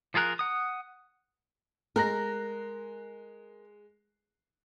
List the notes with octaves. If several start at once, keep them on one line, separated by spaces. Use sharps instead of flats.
F3 F4 G#4 A#4 F#6
F#5 D#6
G#3 A#4 F#6 A#6